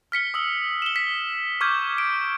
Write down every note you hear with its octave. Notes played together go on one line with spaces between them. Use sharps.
F6 B6 C#7 G7
D#6 E6 F#7
E7 G7
B6
C#6 D6 F6 G6 G#6
D7